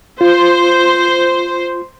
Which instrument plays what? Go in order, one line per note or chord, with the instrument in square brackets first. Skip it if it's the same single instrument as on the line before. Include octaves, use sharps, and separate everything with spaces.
[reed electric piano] F4 [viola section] C5